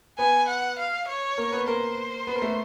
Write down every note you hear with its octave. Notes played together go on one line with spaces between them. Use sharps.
B3 B4 G#5
F#5
F5
C#5
A#3 A#4
B3 B4
A#3 A#4 C5
B3 B4
A#4
A3 A4